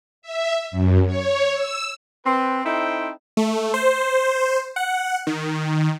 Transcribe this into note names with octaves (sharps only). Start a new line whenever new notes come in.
E5
F#2
C#5
E6
C4 B4
C4 D#4 E4 A4 C5 G5
A3
C5
F#5
D#3